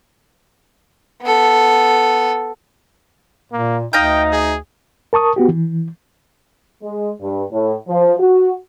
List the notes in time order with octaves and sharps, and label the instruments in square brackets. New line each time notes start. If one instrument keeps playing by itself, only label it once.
[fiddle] B3 A4
[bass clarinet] A#2 [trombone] A#3
[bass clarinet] D2 [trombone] D#4 [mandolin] D#5 F5 G6 [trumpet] G5
[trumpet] G#4
[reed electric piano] A#4 A5 C#6 D#6
B3 F#4 G4
E3
[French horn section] G#3
G2
A2
F3
F#4